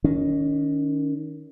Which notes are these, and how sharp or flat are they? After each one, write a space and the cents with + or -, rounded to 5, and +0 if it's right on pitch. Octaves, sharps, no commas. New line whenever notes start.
D#3 +0 C#4 +30